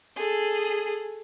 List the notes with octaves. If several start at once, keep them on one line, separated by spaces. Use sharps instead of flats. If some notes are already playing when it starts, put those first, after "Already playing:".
G#4 A4